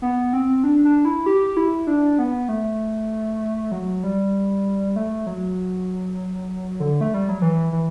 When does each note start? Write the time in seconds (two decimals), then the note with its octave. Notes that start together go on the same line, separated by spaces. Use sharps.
0.02 B3
0.33 C4
0.64 D4
0.85 D4
1.05 E4
1.26 G4
1.57 E4
1.87 D4
2.19 B3
2.49 A3
3.72 F#3
4.04 G3
4.96 A3
5.27 F#3
6.80 D3
7.01 A3
7.14 G3
7.29 F#3
7.42 E3
7.72 E3